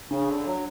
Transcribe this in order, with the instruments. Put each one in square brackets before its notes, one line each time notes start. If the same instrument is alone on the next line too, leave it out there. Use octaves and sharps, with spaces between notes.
[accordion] C#3 [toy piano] D4
[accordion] D3
[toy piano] D4
[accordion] F#3